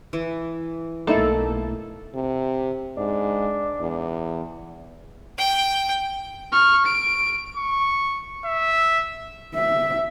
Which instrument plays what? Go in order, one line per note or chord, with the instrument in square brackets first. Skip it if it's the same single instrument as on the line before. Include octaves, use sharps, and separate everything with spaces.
[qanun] E3
[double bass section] B1 A3 [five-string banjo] A#3 D#4 E4 [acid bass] A4
[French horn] C3
[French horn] G#2 [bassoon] D4
[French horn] E2
[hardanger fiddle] G5
[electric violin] C#6 F6
D7
[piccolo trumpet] C#6
E5
[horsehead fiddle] E5